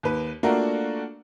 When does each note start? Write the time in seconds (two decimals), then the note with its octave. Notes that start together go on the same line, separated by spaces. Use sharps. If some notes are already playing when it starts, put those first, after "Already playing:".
0.03 D#2 B4
0.43 A3 A#3 D4 F4 F#4 A#4